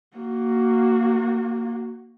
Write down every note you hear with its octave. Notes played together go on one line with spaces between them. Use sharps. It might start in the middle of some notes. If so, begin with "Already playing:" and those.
A#3 F#4